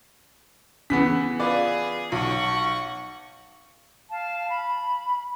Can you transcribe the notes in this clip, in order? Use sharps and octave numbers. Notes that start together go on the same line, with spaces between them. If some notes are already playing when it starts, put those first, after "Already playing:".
C#3 E3 B3 B6
F4 G#4 B4 D5
B1 F#5 C#6
F5 A5
B5